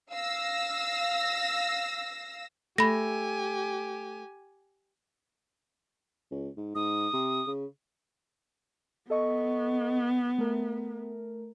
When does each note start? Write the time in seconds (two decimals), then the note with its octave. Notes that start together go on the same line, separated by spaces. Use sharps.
0.12 F5 E6 A#6
2.78 A3 G4 G#5 B5 A#6
6.31 C#2
6.56 G#2
6.75 G#2 D#6
7.13 C3
7.47 C#3
9.10 B3 A4 D#5 C#6
10.38 A3 A#4